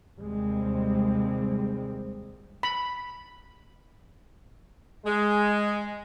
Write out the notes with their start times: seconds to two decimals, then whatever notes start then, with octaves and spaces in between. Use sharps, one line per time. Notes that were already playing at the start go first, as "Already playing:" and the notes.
0.18 D#2 C3 G3 G#3 C4
2.63 B5
5.05 G#3